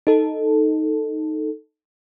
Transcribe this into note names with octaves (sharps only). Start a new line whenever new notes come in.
D#4 A4